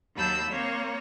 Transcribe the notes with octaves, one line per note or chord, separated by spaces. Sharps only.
D#2 F#3 A5 B5 E6 G6
A#3 C4 C#5